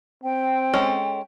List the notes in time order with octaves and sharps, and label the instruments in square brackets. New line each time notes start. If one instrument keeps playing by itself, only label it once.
[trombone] C4 [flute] G5
[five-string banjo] G#3 C#4 A4